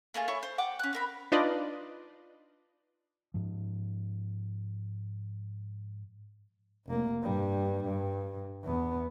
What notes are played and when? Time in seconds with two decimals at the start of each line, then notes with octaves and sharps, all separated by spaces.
0.14 A3 A#3 F4 G#4
0.28 E4 C#5 C#6
0.43 C5
0.58 F#5 G5 D6
0.79 C#4 F#6
0.93 C4 A#4 B5
1.32 D4 D#4 F4 B4 D5 D#5
3.34 G#2 F3
6.86 F1 A#3
7.23 G2 G3
7.85 G2
8.63 E2 B3